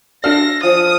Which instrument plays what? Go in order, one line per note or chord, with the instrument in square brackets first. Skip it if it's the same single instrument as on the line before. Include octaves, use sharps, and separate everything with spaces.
[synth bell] D4 F#4 D5 [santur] A4 E5 F5 [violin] A#6
[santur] F3 [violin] D#6